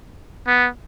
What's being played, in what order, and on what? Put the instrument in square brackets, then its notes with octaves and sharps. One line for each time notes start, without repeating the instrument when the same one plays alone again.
[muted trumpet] B3